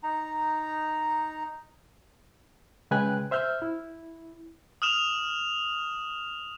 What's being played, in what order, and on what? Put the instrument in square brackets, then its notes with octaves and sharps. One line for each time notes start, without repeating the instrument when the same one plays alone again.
[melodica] D#4 A#5
[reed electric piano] C#3 G#3 B4 G5 G#5 F#6
C5 E5 F6 G6
E4
[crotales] D#6 F6 E7 F7